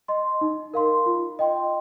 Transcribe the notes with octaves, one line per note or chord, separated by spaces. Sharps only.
D#5 C6
D#4
A#4 F5 C6
F4
D#5 G5 C6